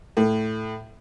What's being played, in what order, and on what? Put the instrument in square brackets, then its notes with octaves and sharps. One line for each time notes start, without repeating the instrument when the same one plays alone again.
[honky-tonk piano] A2